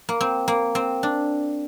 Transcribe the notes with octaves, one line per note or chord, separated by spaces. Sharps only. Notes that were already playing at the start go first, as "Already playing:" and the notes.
A#3
C4
A#3
C4
D4